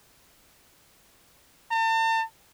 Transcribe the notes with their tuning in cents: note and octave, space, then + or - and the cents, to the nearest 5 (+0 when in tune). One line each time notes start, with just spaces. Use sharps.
A5 +40